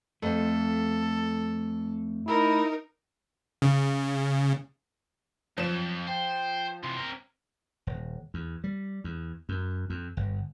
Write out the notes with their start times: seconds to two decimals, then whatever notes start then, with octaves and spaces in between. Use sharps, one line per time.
0.22 F2 A3 C4 A4
2.27 D#4 E4 A#4
3.62 C#3
5.58 F2 F3 F#3 E7
6.07 C5 G5
6.83 C3 E3 C6
6.97 C4 A#4
7.87 D#1
8.34 E2
8.64 G3
9.04 E2
9.49 F#2
9.90 F2
10.17 G1